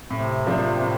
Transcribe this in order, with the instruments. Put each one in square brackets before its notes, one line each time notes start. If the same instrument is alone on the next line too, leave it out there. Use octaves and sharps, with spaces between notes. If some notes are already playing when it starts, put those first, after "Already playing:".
[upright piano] A2 [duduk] C3
[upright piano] F3 A#3 D4
A2